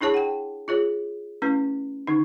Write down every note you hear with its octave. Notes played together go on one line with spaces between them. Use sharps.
D4 E4 G#4 C#5 A5
F#5 G5
F4 G#4 C#5
A3 C#4 E4 B4
D3 D#3 D#4